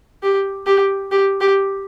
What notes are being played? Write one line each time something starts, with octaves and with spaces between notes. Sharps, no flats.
G4
G4
G4
G4